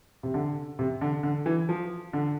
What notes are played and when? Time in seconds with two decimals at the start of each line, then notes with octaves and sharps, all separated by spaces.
0.23 C3
0.34 D3
0.79 C3
1.01 D3
1.23 D3
1.46 E3
1.69 F3
2.13 D3